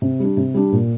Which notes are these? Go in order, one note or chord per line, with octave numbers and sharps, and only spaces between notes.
C3
G3 D4
C3
G3 D4
A#2